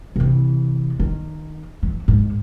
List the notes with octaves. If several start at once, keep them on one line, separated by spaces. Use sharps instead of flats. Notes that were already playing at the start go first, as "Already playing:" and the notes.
C3 E3
D#3
E3
G#2